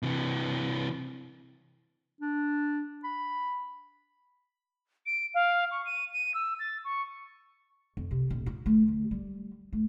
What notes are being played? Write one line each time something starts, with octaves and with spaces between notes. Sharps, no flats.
C3 E3
D4
B5
D7
F5
C#6
D#7
D#7
E6
A6
C#6
F2
C3
D#1
F4
A3
D2
G3
A3